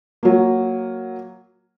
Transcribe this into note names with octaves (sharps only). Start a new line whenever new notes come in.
F#3 A#3